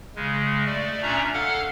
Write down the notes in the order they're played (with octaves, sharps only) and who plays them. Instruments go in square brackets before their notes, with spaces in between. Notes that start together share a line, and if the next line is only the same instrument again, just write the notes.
[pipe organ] C#3 G#3
A3 D5
A#2 C#4 D4 E5 A#5
A4 F5 F#5 F6